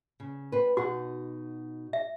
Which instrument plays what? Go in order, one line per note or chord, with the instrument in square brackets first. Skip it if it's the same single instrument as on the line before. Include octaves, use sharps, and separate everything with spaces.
[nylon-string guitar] C#3
C4 B4
[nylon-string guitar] B2 D#4 F#5 [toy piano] F#4
[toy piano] E5